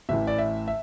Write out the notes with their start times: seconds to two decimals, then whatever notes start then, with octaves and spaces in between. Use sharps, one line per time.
0.09 A1 A2 E3 E5
0.27 D5
0.38 E5
0.68 E5